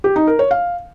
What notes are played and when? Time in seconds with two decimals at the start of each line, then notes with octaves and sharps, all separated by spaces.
0.04 G4
0.16 D#4
0.27 A#4
0.39 C#5
0.51 F5